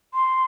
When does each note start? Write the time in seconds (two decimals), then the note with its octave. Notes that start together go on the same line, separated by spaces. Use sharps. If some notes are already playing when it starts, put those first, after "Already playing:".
0.14 C6